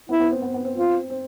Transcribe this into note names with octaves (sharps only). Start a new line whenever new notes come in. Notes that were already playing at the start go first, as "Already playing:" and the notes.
B3 E4
B3
C4
B3
B3
C4
C4 F4
C4